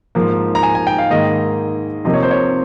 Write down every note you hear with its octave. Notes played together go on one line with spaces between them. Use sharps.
G#2 F3 A#3
A#5
G#5
G#5
G5
F5
G#2 D#3 A#3 D#5
C3 F3 A#3 D#5
C#5
C5
C#5